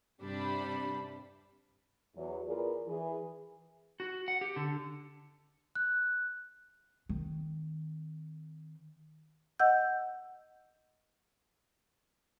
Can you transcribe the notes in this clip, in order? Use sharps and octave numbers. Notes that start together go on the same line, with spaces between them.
G2 C3 G3 D4 B5
E2 F#3
E2 F4 G#4 A#4 B4 D5
E3 G#4
F#4
F#5
G4
D3
F#6
D#3 C4
D#5 F#5 E6 G6